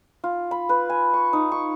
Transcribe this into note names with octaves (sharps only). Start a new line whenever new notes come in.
F4
B5
B4
G#5
C#6
D#4
C#6